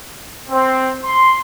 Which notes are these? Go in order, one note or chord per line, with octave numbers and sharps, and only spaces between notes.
C4
C6